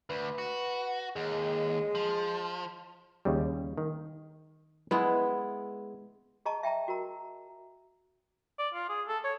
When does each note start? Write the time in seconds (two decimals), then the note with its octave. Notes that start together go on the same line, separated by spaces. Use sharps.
0.10 D2 B4
0.38 F#4
1.16 D#2 G#3
1.95 F3
3.25 D#2 C#3 G3
3.77 D#3
4.91 G#3 B3 E4 B4
6.45 G#4 D#5 A5 A#5 C#6
6.63 E5 G5 A5 A#5
6.88 F#4 A#4 A#5
8.59 D5
8.74 F4
8.89 G#4
9.08 A4
9.24 C#5